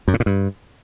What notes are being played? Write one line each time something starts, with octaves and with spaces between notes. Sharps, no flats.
F#2
A2
A#2
G2